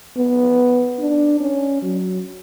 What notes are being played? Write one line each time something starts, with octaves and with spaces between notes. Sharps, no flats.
B3
D4
C#4
F#3